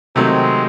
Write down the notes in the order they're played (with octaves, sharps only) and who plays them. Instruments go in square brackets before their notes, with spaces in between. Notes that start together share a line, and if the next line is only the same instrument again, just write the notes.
[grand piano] C3 D#3 F#3 A3 [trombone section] G#3 C4